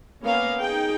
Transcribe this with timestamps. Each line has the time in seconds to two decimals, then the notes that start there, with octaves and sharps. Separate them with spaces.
0.23 A#3 B3 C#4 A#4 F5
0.60 D#4 G#4 G5